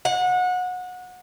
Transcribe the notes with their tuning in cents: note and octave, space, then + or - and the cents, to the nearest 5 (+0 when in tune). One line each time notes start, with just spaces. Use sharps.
F#5 -25